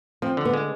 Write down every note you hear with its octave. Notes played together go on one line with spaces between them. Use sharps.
F3 C4
D3
B3
G#3